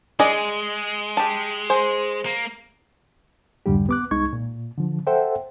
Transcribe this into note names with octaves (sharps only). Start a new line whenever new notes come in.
G#3 G#4 D5 D#5
G4 A5
G#4 C5
A#3
C2 F2 G#2 D3 G3 G4
B3 D6 F#6
C2 G#3 D#4 C#6 G#6
A#2
D3 F3
A4 C5 E5 F#5 G5